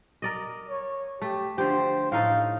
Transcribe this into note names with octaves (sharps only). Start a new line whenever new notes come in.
A#4 D5 D#5
C#5
A3 G4
D3 F3 G4 C5
A2 D#4 A4 F5